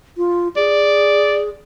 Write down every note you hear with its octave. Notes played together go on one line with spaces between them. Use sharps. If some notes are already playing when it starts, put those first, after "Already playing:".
F4
G#4 D5